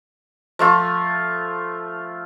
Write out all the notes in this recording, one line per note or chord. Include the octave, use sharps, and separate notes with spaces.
F3 A3 F4